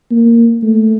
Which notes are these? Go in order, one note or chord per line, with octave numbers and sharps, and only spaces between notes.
A#3
A3